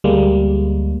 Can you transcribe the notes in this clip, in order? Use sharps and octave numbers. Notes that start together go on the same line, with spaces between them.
D2 G3 G#3 A#3